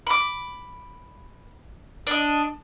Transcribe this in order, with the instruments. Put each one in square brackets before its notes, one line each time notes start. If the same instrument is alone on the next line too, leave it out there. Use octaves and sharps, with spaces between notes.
[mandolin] B5 D6
D4 D#5